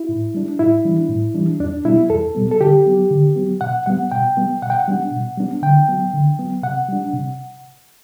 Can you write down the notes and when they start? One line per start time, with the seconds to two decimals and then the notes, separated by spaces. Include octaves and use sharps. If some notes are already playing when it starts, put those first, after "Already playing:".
Already playing: E4
0.09 A2
0.35 G3 D4
0.59 A2 E4
0.85 E3 G3 D4
1.09 A2
1.35 E3 G3 D4
1.60 E2 D4
1.85 B2 G3 B3 E4
2.10 E2 A4
2.35 B2 G3 B3
2.51 A4
2.60 D3 G4
2.86 F#3 B3
3.11 D3
3.36 F#3 B3
3.61 B2 F#5
3.86 G3 B3 F#5
4.12 B2 G5
4.37 G3 B3
4.62 B2 F#5
4.70 G5
4.79 F#5
4.88 G3 B3 D4
5.12 B2
5.37 G3 B3 D4
5.62 D3 G5
5.88 F#3 B3
6.13 D3
6.39 F#3 B3
6.63 C3 F#5
6.89 G3 D4
7.13 C3